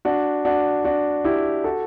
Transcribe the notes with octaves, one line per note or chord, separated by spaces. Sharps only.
D4 F#4
D4 F#4
D4 F#4
E4 G4
F#4 A4